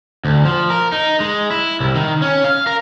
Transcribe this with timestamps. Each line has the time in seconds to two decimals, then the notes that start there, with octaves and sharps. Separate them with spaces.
0.25 D2
0.45 F3
0.70 A#4
0.92 D#4
1.20 G#3
1.51 E4
1.80 C2
1.95 D#3
2.22 C#4
2.44 F5
2.67 A#4